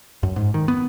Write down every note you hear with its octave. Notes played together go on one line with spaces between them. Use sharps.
F#2
G#2
D#3
B3